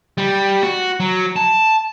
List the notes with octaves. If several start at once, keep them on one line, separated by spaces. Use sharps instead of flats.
G3
F#4
F#3
A5